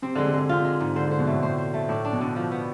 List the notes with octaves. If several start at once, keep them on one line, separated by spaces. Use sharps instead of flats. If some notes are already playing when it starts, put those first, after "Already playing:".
C3 C4
D3 G#3
C3
D3 G#3
C3 F4
G#3
G#2
D3 C5
D3
C5
B2
A2 A3
A2 C5
C5
A3
A2 D4
D4
B2
D3
F3
B3